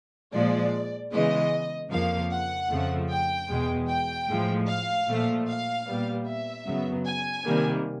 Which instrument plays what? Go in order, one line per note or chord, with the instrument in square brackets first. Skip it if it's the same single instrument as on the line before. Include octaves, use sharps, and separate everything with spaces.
[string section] A#2 F3 G#3 D5
C#3 E3 G#3 B3 D#5
F2 C#3 F3 A#3 F5
F#5
F2 C#3 F3 A3
G5
E2 B2 G#3
G5
A2 F3 G#3
F5
A#2 F3 A3
F5
A#2 G3 B3
E5
F#2 C#3 F#3 B3
G#5
C3 D#3 G3 A#3